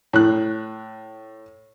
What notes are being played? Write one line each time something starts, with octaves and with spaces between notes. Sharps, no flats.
A2 F#6